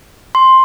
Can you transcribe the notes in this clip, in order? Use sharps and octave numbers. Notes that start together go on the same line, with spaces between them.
C6